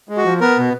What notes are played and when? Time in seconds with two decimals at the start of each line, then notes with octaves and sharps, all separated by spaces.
0.09 G#3
0.17 F#4
0.25 F3
0.41 B3 A#4
0.58 B2